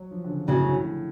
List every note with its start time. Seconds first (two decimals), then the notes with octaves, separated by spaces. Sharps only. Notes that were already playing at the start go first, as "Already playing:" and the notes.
Already playing: F#3
0.11 F3
0.24 D3
0.29 C#3
0.47 F#2 A2 C#3 F#3
0.66 A2